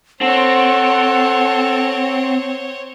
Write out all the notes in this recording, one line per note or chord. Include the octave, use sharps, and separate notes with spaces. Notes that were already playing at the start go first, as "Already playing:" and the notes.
C4 A4 C5 C#5 F#5